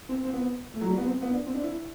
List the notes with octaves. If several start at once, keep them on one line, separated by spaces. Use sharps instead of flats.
C4
C4
B3
A3
F#3
G3
B3
C4
B3
D4
C4
D4
E4